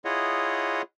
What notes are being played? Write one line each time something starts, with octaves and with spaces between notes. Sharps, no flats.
E4 F4 G#4 C#5 D#5 F#5